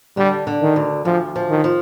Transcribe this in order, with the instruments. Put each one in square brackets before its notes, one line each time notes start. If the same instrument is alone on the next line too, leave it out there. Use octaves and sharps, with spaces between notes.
[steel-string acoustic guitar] D3 [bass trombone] G3
[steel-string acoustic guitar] D3
[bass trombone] D#3
[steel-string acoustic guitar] D2
[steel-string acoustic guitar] D2 [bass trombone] F3
[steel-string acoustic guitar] F3
[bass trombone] D#3
[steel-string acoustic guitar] F3